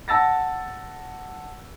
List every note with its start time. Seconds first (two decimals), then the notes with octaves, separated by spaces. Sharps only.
0.08 F#5 A5 E6 A6 A#6